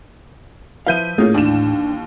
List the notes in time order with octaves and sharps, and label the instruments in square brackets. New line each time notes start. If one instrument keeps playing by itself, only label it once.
[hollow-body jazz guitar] F3 B4 F5 [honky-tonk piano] E4 G6 D#7
[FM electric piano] A2 [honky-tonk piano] A#3 C#4 F4 [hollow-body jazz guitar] G#4
[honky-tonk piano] D#2 E3 E7 [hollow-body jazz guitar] D4